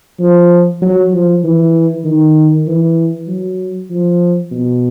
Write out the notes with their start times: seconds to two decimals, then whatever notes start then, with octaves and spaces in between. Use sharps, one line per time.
0.20 F3
0.82 F#3
1.12 F3
1.44 E3
2.04 D#3
2.67 E3
3.28 F#3
3.90 F3
4.51 B2